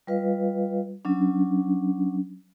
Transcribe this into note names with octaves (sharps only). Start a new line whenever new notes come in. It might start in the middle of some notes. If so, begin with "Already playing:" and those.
G3 F4 B4 D#5 F5
F#3 C#4 D4